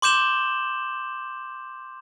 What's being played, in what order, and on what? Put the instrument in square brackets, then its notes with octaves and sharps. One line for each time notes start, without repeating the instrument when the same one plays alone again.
[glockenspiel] C6 D6 G6 E7 F#7 G7